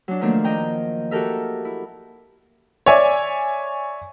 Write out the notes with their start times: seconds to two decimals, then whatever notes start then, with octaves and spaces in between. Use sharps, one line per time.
0.08 F#3 D4
0.21 D#3 F3 A3 A#3 D4
0.44 D#5 G5 A#5
1.11 F#4 G4 A4 A#4 E5
1.65 E4
2.86 C#5 D5 E5 G#5